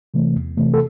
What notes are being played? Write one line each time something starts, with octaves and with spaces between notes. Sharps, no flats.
C3 E3 A3
E2
C3 E3 A3
A4